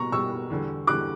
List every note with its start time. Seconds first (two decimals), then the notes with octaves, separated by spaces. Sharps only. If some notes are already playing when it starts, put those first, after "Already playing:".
Already playing: B2 G3 A#5 C#6
0.12 B2 G3 C#6 E6
0.50 E2 D3 G3
0.87 E2 D3 G3 D6 F#6